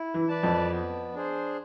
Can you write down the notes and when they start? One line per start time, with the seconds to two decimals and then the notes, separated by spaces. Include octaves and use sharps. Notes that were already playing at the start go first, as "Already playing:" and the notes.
Already playing: E4
0.14 E3
0.28 B4 D5 A5
0.43 F2 F3
0.72 B3
1.14 D4 G#4 C5